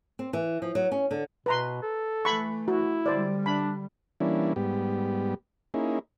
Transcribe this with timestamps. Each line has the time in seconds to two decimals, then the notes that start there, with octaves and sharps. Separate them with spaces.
0.19 C4
0.33 E3
0.62 F3
0.75 F#3
0.92 C#4
1.11 D3
1.46 B2 B4 A#5 C6
1.83 A4
2.25 E3 A3 B5 C#6
2.68 E4 F#4
3.06 D3 G3 C5 D5
3.46 D4 B5
4.20 E3 G3 A#3 C#4 D4 E4
4.56 G#2 G3 B3 G4
5.74 A#3 C#4 D#4 E4 G#4